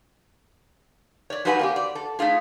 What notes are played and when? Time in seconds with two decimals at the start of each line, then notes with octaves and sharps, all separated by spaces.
1.30 C#5 D5
1.45 F#3 D#4 G4 B4 F#5 G#5
1.59 A#3 C4 G4
1.76 D5
1.95 A4
2.19 A3 D#4 F4 G#4